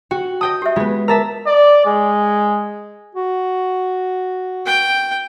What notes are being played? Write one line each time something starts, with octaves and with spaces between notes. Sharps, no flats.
F#4 G5
D#5 G5 A5 D#6
G4 E5
G#3 B3 F4
G#4 A#4 E5 A5 A#5
D5
G#3
F#4
G5